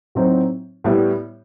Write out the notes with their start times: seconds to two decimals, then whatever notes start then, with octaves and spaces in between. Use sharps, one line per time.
0.15 A2 F#3 C4 D#4
0.84 A2 G3 B3 E4